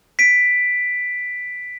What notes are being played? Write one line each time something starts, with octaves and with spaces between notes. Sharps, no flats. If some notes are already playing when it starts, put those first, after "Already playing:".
B6 D7